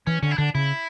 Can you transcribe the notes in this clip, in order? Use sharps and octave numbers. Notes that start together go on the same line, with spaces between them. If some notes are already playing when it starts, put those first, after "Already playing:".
E3 C#4
D3 C#4
E4
D3 D4
C#3 E4